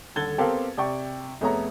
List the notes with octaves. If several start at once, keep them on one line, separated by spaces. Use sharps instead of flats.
D#1 D3 A4 G#6 A6 G7
B3 C4 G4 A4 A#4 F5
C3 D5 G5 C#6
F2 A3 B3 G#4 C#5 A#5